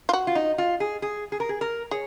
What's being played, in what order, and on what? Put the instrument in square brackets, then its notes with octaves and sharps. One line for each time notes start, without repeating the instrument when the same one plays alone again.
[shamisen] F4
F#4
[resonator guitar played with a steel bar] F4
D#4
F4
G#4
G#4
G#4
A#4
G#4
A#4
[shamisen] G#4 [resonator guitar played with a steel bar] C#5